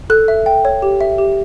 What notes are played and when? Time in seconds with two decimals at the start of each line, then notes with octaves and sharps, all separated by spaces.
0.10 A4 F#6
0.28 E5
0.46 G5
0.65 C#5
0.82 G4
1.01 E5
1.18 G4